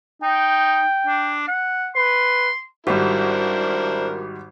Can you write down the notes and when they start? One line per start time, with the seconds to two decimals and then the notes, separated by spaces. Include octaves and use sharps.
0.22 D#4 G5
1.07 D4
1.48 F#5
1.95 B4 C6
2.87 G#1 G3 D4 E4 F#4 A#4 C5